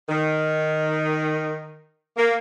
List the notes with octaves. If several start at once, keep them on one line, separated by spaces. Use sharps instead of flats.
D#3
A#3